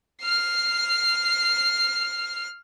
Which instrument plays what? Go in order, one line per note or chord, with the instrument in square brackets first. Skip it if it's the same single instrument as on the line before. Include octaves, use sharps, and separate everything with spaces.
[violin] F6 C7